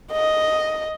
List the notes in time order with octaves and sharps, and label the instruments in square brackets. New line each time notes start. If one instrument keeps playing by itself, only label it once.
[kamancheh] D#5